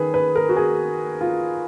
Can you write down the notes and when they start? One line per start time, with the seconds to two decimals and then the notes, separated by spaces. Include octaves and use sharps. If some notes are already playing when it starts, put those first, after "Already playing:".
Already playing: D#3 G#4 B4
0.14 B4
0.36 A#4
0.49 F#4
0.56 G#4
1.21 F4